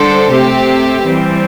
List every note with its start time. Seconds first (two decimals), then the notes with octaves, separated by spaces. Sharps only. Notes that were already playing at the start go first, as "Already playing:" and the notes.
Already playing: D3 G3 D4 A4 C5
0.30 C3 A3 C4 G4
1.04 E3 G3 C4